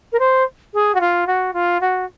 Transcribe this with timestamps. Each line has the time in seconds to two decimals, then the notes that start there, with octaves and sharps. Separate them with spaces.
0.12 A#4
0.19 C5
0.74 G#4
0.94 F#4
1.00 F4
1.27 F#4
1.53 F4
1.81 F#4